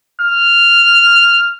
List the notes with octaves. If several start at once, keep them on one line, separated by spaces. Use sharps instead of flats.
F6